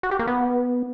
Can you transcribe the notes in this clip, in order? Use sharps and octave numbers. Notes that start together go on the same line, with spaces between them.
F#4
G4
A#3
B3